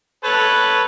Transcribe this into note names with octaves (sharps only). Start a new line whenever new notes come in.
A4 B4 C#5